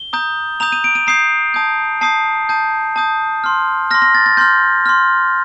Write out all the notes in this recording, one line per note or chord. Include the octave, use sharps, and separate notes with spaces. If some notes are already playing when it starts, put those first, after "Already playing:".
Already playing: G7
A#5 D#6 G6
A#5 D#6 G6 F7
D#7
D7
D#7
A#5 D#6 G6 C7
A5 D#6 G6
A5 D#6 G6 C7
A5 D#6 G6
A5 D#6 G6
C6 F6
C6 F6 A#6
A#6
A6
A6
C6 F6 G6
C6 F6